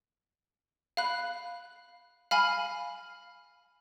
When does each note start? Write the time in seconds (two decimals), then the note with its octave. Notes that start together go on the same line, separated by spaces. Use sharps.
0.97 F5 B5 F#6
2.31 F5 G#5 B5 F6